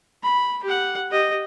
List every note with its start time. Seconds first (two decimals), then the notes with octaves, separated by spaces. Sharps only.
0.23 B5
0.64 G4 F#5
1.11 G4 D#5